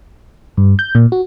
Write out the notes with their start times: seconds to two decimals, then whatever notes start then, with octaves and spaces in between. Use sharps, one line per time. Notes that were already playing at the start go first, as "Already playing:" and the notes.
0.57 G2
0.79 G6
0.95 A#2
1.12 F#4